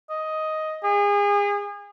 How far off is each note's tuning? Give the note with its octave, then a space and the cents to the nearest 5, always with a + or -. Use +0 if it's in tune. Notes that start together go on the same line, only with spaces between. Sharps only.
D#5 +10
G#4 -35